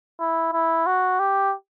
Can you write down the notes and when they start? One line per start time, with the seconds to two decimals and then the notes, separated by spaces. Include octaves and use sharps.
0.20 E4
0.53 E4
0.86 F#4
1.19 G4